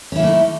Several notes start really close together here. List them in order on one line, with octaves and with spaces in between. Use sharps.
C#4 E4 A#3 A3 D#4